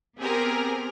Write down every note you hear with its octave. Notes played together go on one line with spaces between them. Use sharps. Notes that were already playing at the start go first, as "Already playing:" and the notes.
B3 C4 G4 G#4 A#4